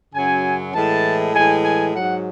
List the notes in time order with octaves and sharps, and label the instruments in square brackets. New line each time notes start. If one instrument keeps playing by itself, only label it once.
[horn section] F#2 C#3 F#3 G#5
A2 E3 G#3 A5
A2 E3 G#3 G#5
G#5
G#2 F#3 F#5